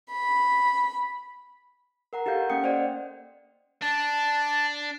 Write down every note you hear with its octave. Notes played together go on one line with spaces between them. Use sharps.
B5
A#4 F#5 A#5
D#4 G4 A4 F5 G6
A#3 C#4 F#5 G5 D#6 C#7
C5 D5 D#5
D4 A5